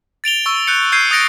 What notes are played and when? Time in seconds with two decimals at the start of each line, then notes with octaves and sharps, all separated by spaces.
0.24 A6 D7 F7 G7
0.46 C#6 E6
0.67 F#6 G6 C#7
0.92 E6 G6 G#6 C7 D#7
1.11 D#6 F#6 A6 A#6 C#7 D7